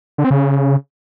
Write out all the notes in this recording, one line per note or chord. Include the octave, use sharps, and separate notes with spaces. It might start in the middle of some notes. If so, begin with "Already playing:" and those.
D3
C4
C#3